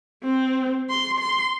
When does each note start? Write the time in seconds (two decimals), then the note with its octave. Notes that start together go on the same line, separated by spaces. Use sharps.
0.24 C4
0.90 C6
1.19 C6